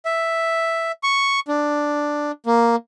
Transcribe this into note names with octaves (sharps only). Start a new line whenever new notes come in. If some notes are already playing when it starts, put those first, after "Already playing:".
E5
C#6
D4
A#3